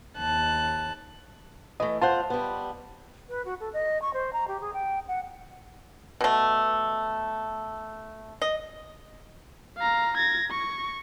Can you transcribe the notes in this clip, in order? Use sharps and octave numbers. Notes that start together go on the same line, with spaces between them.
D#2 A5 F#6
E3 A3 D#5
F4 C5 F#5 A5
G3 B3
B4
F#4
A4
D#5
C#6
C5
A#5
G4
G#4
G5
F#5
B2 A3
D#5
F5 A#5
G#6 A#6
C#6